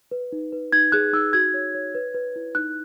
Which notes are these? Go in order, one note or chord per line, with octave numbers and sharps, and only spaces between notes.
B4
D#4
B4
D#4 G#6
G#4 F#6
D#4 E6
F#4 G#6
C#5
C#5
B4
B4
E4
D#4 F#6